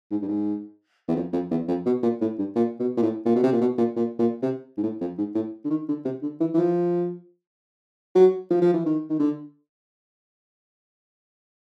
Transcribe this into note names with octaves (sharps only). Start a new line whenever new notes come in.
G#2
G2
G#2
E2
F2
F2
E2
F2
B2
A#2
A2
G2
A#2
B2
A#2
A2
A#2
B2
C3
A#2
B2
A#2
A#2
A#2
C3
G#2
A2
F2
G#2
A2
D3
D#3
D3
C3
D3
E3
E3
F3
F#3
F3
F3
E3
D#3
D#3
D3